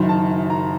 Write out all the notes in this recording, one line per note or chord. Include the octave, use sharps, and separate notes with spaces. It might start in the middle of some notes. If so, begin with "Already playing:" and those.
Already playing: F#1 F#2 D#3
A5
A#5